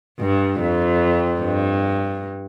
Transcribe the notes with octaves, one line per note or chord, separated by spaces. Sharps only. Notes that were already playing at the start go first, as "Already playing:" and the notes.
G2
F2
G2